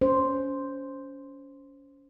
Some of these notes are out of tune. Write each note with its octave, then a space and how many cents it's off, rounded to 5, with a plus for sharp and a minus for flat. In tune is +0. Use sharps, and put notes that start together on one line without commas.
C#4 +25 C5 +0